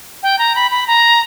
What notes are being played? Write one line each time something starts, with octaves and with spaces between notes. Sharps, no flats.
G5
A#5
B5
B5
A#5